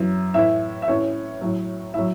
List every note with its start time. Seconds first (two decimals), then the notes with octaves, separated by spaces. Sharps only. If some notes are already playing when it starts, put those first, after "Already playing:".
Already playing: F#2 E3
0.34 A2 E3 E4 E5
0.82 E5
0.88 A2 E3 C#4 C#5
1.41 A2 F#3
1.94 A2 F#3 E4 E5